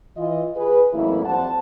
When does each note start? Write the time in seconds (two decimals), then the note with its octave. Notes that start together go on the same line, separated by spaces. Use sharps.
0.17 E3 F4 D#5
0.56 G#4 B4
0.94 A1 F2 F#3 A#3 E4
1.25 F2 G3 C5 F#5 A5